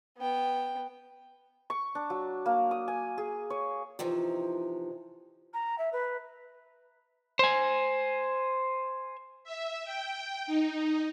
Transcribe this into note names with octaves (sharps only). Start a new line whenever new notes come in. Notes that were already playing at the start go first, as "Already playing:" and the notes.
B3 G5
C#6
D4
F#3
A#3
D#6
G#5
G#4
C#5
C3 E3 F3 D#4
A#5
E5
B4
C5 G#5
E5
G5
D#4